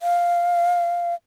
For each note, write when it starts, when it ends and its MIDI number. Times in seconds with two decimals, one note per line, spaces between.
0.01 1.15 77